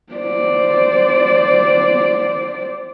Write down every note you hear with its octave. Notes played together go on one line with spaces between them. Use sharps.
C5 D5